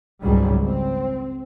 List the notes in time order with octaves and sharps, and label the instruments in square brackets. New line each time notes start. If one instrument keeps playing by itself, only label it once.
[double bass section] G#1 C#2 G#2 F#3 G3
C4